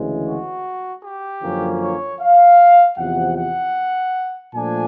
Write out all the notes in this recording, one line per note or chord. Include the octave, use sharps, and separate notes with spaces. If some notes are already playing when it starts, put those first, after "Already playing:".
Already playing: D2 C#3 E3 G#3
F#4
G4
F#2 D3 F3 A#3 C#4
C#5
F5
E2 C3 F3 F#5
F#5
A#2 F3 A3 D4 G#5